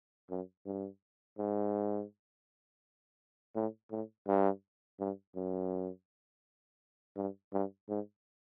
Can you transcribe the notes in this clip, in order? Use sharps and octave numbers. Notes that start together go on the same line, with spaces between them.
F#2
G2
G#2
A2
A2
G2
G2
F#2
G2
G2
G#2